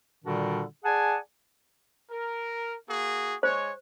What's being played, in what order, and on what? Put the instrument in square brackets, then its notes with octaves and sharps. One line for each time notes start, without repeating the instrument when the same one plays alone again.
[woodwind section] A#2 D3 D#3 G3 D4 F#4
G#4 D5 F#5 G#5 A5
[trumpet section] A#4
A#3 F#4 G#4
[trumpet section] G#3 C#5 [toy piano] C5